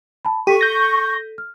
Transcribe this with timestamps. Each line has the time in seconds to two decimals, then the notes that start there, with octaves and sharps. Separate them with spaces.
0.25 A5 B5
0.47 G4 A4 C#6 B6 D#7
0.61 G6 A#6
1.38 F6